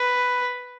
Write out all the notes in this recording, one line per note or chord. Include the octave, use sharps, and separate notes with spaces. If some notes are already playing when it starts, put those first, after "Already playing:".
Already playing: B4